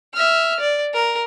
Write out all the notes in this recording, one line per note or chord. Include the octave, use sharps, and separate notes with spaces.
E5 F6
D5
A#4